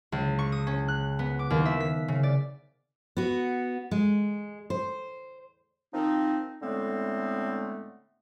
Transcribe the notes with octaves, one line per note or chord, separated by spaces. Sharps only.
C#2
C#6
D#6
C#4
F#6
B3
D6
D#2
E5
B6
C#3
D5
B3 F#4
G#3
C5
D#3 F3 C4 D#4
A2 D3 G#3 A3 B3 C4